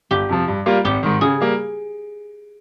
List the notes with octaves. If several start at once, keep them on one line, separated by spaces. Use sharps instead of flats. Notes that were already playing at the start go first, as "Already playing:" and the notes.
G1 G4
F2 C3 F3
G2
G3 A#3 F4
G#1 G4
G#2 D#3
C#3 G#4
G3 A#3